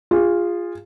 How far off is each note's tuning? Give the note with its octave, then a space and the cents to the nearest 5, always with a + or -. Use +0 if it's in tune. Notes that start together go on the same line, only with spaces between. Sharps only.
F4 +0 G#4 -25